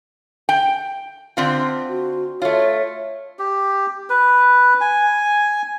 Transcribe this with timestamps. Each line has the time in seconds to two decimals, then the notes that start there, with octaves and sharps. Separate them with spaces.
0.49 G5
1.37 D3 C4 F4
1.89 F#4
2.42 A3 F4 C#5
3.39 G4
4.10 B4
4.81 G#5